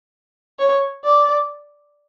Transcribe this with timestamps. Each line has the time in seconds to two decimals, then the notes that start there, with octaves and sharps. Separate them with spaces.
0.59 C#5
1.04 D5